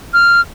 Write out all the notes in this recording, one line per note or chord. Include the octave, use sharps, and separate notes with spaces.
F6